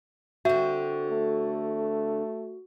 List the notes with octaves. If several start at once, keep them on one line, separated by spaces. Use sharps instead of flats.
D3 C4 F#4 E5
A3